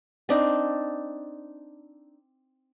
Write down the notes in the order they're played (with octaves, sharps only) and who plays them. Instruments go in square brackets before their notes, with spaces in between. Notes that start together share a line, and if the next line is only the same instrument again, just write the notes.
[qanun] C4 D4 D#4